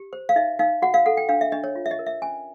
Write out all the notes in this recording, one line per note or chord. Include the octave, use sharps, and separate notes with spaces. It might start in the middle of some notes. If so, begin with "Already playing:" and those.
Already playing: G4
C5
F5
D#4 E5
D#4 F5
F#4 F#5
F5
A4 F#5
G5
D4 F5
E5
D4 D#5
C#5
F4
E5
D#5
A#4
E5
C#4 G#5